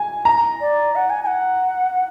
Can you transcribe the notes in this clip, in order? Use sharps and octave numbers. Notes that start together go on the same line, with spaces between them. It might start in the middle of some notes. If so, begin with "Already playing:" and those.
Already playing: G#5
A#5
D5
F#5
G#5
G#5
F#5